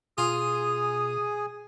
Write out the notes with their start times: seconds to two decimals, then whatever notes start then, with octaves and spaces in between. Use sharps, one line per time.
0.18 B2 F4 G#4 G#5 D#6